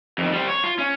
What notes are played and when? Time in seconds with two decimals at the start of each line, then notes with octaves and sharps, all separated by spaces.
0.18 F2 D#3
0.32 G3 C4
0.48 C#5
0.64 F4
0.79 C#4